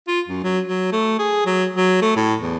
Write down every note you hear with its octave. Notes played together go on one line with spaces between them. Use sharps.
F4
F#2
F#3
F#3
A3
G#4
F#3
F#3
A3
A2
E2